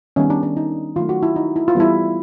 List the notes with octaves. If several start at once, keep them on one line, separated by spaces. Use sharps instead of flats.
D#3 G3 B3 C#4
D4
D4
D#4
D#3 F#3 A3 F4
F#4
E4
D#4
E4
F4
E3 G3 B3 E4